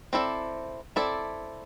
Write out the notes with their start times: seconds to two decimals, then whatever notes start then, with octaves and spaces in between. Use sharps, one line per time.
0.13 C4 E4 A4 D5
0.96 C4 E4 A4 D5